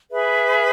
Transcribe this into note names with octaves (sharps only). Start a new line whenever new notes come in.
G#4 B4 E5 B5